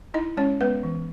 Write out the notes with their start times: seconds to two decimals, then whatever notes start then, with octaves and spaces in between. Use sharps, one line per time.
0.14 D#4 E4 D#5
0.37 G#3 C#4 C#5
0.61 G#3 B3 B4
0.83 E3